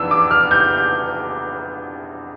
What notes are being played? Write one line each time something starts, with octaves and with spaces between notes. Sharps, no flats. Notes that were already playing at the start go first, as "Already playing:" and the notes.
Already playing: F2 E3 B3 D4 E6
D6
F6
G6